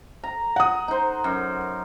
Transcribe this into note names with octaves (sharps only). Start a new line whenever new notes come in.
A#5
F#5 D#6
D#4 C5
F#2